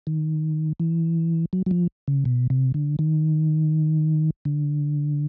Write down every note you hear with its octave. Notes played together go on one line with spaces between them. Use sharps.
D#3
E3
F#3
F#3
F3
C#3
B2
C3
D3
D#3
D3